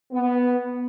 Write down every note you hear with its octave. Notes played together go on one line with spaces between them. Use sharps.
B3